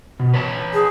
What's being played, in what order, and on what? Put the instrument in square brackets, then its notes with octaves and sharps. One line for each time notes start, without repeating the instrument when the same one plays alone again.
[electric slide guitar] B2
B4 C#5 A5
[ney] G#4